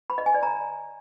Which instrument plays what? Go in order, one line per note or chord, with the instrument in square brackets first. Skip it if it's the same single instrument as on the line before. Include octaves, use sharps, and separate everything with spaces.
[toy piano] B5
D#5
G#5
D5
A#5